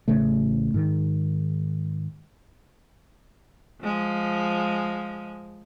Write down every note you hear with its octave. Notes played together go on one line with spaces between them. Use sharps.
A1 C#3 A3
G#2 D#3
F3 G#3